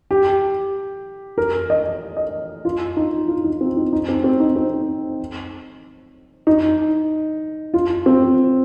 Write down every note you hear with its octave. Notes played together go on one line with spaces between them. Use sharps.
G4
A#4
D#5
D#5
F4
D#4
F4
D#4
C4
D#4
D#4
C4
C4
D#4
C4
D#4
F4
C4